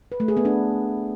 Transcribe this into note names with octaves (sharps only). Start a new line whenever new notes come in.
B4
A3
G#4
B3
D4